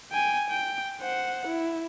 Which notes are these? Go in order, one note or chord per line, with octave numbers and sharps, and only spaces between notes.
G5 G#5
G5
C5 F#5
E4